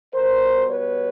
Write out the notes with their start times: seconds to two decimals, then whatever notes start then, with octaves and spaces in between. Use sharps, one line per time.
0.14 B2 G3 B3 A#4 C5
0.67 B4 C#5